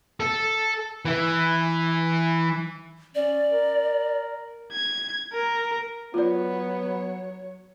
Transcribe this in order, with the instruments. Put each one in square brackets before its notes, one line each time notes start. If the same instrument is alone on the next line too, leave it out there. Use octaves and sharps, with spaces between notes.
[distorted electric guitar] A4
E3
[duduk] C#4 [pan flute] D5
[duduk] A#4
[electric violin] G#6
A#4
[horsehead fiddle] F#3 C#5 [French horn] B3 [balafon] F4 D5